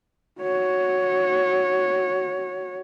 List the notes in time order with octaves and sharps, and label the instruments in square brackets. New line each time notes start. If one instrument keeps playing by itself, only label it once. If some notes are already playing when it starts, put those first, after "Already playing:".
[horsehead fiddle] F#4 C#5